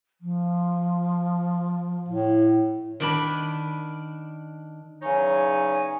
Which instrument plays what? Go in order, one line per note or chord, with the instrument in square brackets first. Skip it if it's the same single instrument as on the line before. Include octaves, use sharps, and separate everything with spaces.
[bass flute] F3
[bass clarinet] A2
[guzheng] D#3 D4 B5
[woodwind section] E2 C#3 F#3 D#4 C#5 G#5